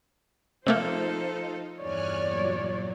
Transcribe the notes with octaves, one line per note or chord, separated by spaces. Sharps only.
C3 F3 A3 A#3 D#4 F4 A4 C5
E2 G2 C#5 D5 G#5 F6 F#6
A#2 F#3